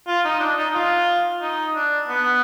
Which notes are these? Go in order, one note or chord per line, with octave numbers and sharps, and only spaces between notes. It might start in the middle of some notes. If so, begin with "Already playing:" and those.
F4
D#4
D4
D#4
F4
D#4
D4
B3